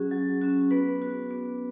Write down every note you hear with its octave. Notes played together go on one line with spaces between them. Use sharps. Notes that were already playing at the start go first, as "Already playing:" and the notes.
Already playing: F#3 C#4 F#4 G#4
F#3
C#4 F#4
B3 B4
F#4
B3